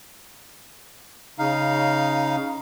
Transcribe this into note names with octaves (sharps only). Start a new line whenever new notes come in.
C#3 D#4 F5